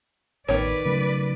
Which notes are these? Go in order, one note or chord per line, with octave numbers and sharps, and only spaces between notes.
A1 D#3 B3 B4 C#5 D5
C#3 F#3 A3